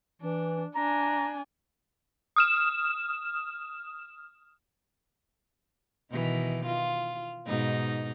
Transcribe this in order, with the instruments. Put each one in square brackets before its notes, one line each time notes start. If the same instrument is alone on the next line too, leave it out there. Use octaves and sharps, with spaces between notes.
[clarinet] E3 [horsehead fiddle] D4
[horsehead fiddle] D4 G#5 [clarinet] A#5
[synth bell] D#6 F6 E7
[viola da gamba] B2 D#3 E3
F4
G#2 B2 D#4